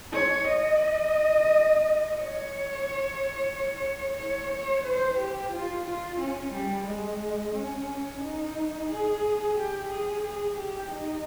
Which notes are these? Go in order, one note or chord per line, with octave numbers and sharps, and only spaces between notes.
C#5
D#5
C#5
C#5
C#5
C5
G4
F4
F4
C#4
G3
G#3
C#4
D#4
G#4
G4
G#4
G#4
G4
D#4